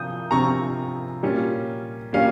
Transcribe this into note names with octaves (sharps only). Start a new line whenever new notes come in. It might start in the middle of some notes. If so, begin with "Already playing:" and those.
Already playing: C3 F3 D#6 G6
C3 F3 C4 F4 A#5 C#6
A#2 G3 C#4 F4
A#2 G3 C#4 F4 F5